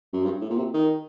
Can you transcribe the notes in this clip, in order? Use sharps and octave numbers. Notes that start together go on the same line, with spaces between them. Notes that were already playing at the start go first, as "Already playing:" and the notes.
F#2
G2
A2
A#2
C3
D#3